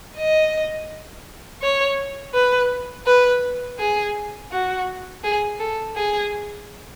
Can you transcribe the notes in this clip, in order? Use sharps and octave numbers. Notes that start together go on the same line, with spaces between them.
D#5
C#5
B4
B4
G#4
F#4
G#4
A4
G#4